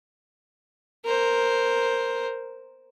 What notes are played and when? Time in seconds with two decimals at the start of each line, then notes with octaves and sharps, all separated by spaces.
1.05 A#4 C5